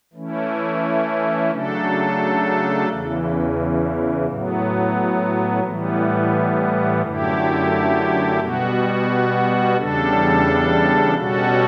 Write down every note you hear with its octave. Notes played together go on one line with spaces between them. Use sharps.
E3 A3 C#4 E4
C#3 F#3 A3 D4 A4
E2 C#3 E3
A2 F#3 B3
A2 E3 G3 B3
F#2 D3 A3 E4 G4
B2 G3 B3 F#4
E2 C#3 G3 D4 A4
B2 G3 C#4 F#4 A4